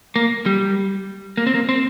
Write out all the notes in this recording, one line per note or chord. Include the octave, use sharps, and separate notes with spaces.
A#3
G3
A#3
C4
A#3
C4